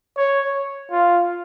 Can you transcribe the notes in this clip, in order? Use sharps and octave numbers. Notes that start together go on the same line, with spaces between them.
C#5
F4